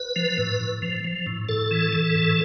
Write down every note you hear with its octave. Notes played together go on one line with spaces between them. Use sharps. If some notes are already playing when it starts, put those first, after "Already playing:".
Already playing: B4
F3
A2
A2
F3
F3
A2
A2 A4
E3
E3
A2